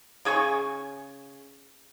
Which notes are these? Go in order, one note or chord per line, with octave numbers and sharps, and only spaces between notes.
C#3 G#4 G#5 C#6